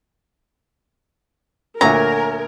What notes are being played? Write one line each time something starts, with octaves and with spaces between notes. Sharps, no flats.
D2 A#2 F#3 A#4 E5 G#5 A#5 G#6